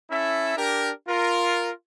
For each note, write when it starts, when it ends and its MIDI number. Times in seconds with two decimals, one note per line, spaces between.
0.10 0.53 61
0.10 0.53 64
0.10 0.53 69
0.10 0.53 76
0.57 0.90 62
0.57 0.90 67
0.57 0.90 70
1.08 1.71 65
1.08 1.71 70